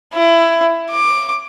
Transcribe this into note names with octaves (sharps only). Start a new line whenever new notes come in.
E4
D6